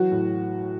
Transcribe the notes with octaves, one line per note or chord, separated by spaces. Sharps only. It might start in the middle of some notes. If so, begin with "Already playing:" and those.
Already playing: E3 F#3 F#4
A2